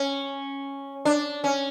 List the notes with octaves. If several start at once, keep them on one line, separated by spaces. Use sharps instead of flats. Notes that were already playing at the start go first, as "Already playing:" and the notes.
Already playing: C#4
D4
C#4